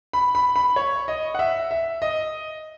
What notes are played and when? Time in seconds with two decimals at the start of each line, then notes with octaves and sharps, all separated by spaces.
0.13 B5
0.35 B5
0.56 B5
0.76 C#5
1.08 D#5
1.35 F#5
1.39 E5
1.71 E5
2.02 D#5